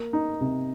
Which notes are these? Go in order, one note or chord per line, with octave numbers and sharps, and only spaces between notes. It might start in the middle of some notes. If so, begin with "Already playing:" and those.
Already playing: A#3
D#4
C3